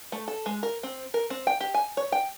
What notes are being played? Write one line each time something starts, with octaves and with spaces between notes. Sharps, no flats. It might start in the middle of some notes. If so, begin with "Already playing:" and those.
A3
A4
G#3
A#4
C4
A#4
C4
G5
G4
G#5
C#5
G5